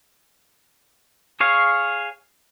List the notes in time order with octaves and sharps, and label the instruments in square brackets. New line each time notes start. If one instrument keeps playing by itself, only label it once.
[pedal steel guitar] G#4 C#5 F5